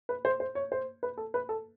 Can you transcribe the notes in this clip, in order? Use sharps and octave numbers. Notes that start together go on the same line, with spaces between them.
B4
C5
C5
C#5
C5
B4
A4
B4
A4